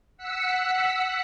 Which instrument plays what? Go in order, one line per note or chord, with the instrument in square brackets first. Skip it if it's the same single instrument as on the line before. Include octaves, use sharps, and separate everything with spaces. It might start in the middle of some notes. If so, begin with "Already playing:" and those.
[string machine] F#5 E6 B6 C#7